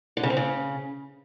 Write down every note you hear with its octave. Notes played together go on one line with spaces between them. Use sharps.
D3
C#3
C4
C#3